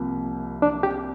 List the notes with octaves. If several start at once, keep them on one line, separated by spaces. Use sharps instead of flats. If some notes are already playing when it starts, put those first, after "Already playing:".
Already playing: C2 C3 F3 A#3
D4
G4